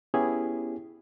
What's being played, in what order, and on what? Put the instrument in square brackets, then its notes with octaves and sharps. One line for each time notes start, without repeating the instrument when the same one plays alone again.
[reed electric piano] B3 C#4 E4 G4 G#4